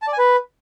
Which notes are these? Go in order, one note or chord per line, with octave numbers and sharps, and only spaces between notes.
A5
D5
G#5
B4